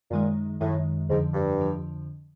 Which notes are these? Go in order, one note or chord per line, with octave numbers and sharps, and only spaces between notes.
F#2 A#2 D#3 G#3
F#2 A2 D#3 G#3
F2 G#2 D3 F3
G2
F2 D3 F3